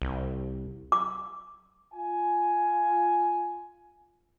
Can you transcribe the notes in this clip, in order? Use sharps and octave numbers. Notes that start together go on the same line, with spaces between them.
C2
D6
F4 G#5